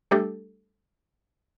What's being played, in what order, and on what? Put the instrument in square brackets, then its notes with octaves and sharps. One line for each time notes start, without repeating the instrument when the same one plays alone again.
[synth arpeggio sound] G3 A3 D4 G4 A4